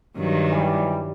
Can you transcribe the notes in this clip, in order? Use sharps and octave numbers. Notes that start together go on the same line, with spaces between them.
G2 D#3 F#3
E3 G3